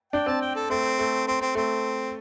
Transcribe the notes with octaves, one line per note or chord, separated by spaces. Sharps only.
D4 G5
C4 A5
G5
A4
A3 C4
A3
C4
C4
A3 C4